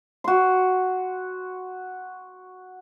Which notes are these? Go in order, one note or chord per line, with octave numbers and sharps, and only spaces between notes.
F#4 C6